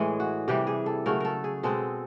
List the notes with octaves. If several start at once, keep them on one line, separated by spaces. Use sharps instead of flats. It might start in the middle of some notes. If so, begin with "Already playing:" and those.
Already playing: A2 E3 G#3 G#4
F#4
C3 E3 G3 G4
G#4
A4
C#3 F#3 A3 A#4
A4 A#4
G#4
B2 G#3 C4 A4